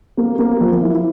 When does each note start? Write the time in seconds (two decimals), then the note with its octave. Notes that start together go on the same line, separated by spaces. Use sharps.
0.17 A#3
0.39 A#3
0.61 F3
0.82 E4